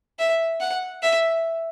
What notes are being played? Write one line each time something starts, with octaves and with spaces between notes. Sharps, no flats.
E5
F#5
E5